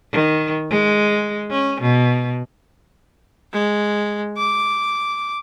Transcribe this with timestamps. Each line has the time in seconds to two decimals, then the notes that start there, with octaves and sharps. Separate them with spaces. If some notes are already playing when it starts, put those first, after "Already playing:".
0.12 D#3
0.70 G#3
1.50 C#4
1.81 B2
3.53 G#3
4.38 D6